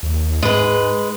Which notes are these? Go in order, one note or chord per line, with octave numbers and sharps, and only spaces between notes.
D#2
G#2 G#3 B4